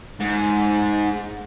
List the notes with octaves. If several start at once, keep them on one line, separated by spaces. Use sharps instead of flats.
G#2